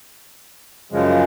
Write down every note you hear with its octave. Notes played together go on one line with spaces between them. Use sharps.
F#2 C#3 F3 G#3